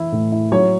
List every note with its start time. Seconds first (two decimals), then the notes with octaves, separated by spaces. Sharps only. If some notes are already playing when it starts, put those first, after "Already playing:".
Already playing: E3 E4
0.12 A2
0.32 E4
0.52 F#3 C#5